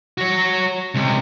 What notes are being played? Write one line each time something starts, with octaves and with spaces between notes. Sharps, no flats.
F#4 C#5
C#2 C3